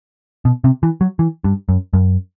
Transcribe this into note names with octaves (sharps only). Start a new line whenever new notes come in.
B2
C3
E3
F#3
E3
G2
F#2
F#2